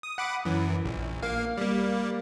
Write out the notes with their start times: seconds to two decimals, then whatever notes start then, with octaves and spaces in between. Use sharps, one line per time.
0.03 D#6
0.18 F#5 B5 D6
0.45 F#2 E3
0.86 A#1
1.22 A#3 F5
1.58 G3 A#3